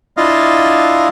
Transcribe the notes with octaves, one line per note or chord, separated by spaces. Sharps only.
D4 E4 F4 D#5 F5